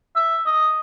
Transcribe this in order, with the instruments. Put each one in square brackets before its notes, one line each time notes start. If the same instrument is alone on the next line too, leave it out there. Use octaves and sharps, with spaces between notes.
[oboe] E5
D#5